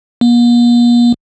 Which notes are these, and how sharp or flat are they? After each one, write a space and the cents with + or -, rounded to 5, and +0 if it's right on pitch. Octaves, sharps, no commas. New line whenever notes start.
A#3 +45